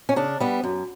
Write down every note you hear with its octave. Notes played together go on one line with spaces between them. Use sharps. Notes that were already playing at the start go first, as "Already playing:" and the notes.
C#4
C#3 D4
G3 B3
F#2